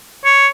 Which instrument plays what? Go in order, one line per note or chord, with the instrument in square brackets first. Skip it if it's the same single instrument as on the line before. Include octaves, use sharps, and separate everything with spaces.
[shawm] C#5